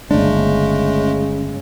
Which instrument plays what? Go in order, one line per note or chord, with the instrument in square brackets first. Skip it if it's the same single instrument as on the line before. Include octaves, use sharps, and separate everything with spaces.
[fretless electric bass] G1 D4 [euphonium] C#3 [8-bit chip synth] G#3 A3